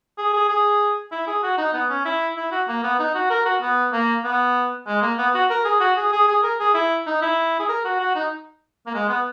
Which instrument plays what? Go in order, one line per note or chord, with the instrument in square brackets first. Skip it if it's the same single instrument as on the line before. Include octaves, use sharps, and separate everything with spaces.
[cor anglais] G#4
G#4
G#4
E4
G#4
F#4
D#4
B3
C#4
E4
E4
F#4
A#3
B3
D#4
F#4
A#4
F#4
B3
A#3
B3
G#3
A#3
B3
F#4
A#4
G#4
F#4
G#4
G#4
G#4
A#4
G#4
E4
D#4
E4
G#4
A#4
F#4
F#4
D#4
A#3
G#3
B3